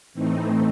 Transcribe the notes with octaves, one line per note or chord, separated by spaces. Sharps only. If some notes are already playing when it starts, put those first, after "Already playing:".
A2 E3 A3 C4 D#4